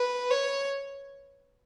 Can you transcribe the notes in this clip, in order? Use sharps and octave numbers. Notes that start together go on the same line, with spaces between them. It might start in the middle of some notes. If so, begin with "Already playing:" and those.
Already playing: B4
C#5